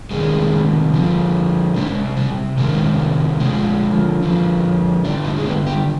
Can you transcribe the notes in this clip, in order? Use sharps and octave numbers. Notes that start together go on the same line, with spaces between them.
C3 D#3 G3 G#3
D3 F3
C3 G3 G#3
G3
C3 D#3 G3 G#3
D3 F3 G#3
D3 F3
D3 G3 D4
D#4
G#3
B3
G4